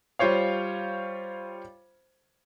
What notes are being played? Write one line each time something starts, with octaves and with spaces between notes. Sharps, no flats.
G3 F4 C5 C#5 F5